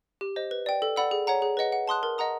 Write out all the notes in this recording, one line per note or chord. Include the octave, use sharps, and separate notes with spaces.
G4
C5 D#5
B4
D5 G5
A4
D5 F#5 B5 E6
G#4
C#5 F#5 A#5
G#4
B4 D#5 F#5
F#5
A5 C6 D#6 F#6
A#4
D#5 F#5 A#5 D#6